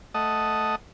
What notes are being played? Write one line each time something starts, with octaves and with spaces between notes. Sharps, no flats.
A3 D#5 F#5 A5 D#6